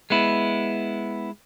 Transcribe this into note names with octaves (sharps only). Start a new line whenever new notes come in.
G#3 B3 E4